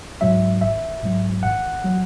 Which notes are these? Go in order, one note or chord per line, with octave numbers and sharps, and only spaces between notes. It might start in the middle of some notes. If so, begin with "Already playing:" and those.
G#2 F#3 E5
G#1 E5
G#2 F#3
G#1 F#5
F#3